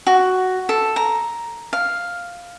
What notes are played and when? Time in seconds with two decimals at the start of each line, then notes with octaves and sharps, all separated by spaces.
0.07 F#4
0.69 A4
0.96 A#5
1.73 F5